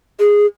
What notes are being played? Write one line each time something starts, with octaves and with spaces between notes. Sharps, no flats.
G#4